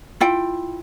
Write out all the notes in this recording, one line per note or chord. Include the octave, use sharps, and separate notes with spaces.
E4 F4 G5